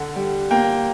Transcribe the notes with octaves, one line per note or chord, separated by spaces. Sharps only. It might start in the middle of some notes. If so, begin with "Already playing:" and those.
Already playing: D3 F#5
G3
A#3 G5